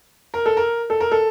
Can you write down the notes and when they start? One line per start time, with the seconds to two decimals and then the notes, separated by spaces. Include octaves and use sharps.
0.34 A#4
0.46 A4
0.57 A#4
0.90 A4
1.00 A#4
1.11 A4